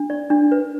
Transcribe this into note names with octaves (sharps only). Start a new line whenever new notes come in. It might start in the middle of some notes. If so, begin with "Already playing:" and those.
Already playing: D4
D5
D4
B4